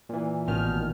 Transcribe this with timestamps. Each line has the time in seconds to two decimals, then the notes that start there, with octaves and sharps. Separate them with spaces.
0.09 A#2 E3
0.48 A1 B2 D#3 F6